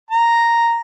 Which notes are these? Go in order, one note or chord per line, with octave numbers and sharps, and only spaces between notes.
A#5